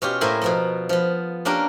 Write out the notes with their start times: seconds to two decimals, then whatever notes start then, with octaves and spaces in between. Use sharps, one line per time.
0.02 B2 C#4 F4 G4
0.21 A2 A#3 C5 E5 G#5
0.42 B2 F3 B3
0.89 F3 B3
1.45 A#3 C#4 D4 G4 A#4